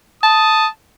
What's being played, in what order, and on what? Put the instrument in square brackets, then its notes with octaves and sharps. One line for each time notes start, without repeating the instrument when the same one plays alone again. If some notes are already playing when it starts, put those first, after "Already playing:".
[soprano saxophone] A5 [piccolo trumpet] D#6